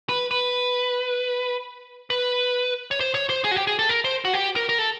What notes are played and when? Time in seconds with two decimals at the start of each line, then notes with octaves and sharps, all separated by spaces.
0.09 B4
0.31 B4
2.10 B4
2.91 C#5
3.00 C5
3.15 C#5
3.30 C5
3.44 G#4
3.51 F#4
3.56 G4
3.67 G#4
3.79 A4
3.89 A#4
4.04 C5
4.25 F#4
4.34 G4
4.56 A#4
4.69 A#4
4.79 A4